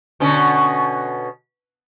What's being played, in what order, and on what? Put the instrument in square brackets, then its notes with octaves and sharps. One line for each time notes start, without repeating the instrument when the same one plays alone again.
[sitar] B2 D3 C#4